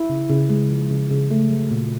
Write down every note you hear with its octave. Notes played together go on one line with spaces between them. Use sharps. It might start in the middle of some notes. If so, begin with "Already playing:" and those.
Already playing: E4
C#3
C#3
G#3
F3
C#3
C#3
A3
F#3
A#2